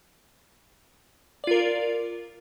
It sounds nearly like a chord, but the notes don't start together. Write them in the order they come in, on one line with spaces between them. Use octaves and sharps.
D5 F4 A#4